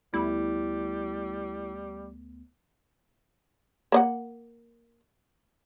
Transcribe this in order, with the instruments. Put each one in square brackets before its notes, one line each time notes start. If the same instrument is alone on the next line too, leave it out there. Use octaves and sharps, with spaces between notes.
[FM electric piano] D2 A3 B3 [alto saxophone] G3 [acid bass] E4
[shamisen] A#3 D5 F#5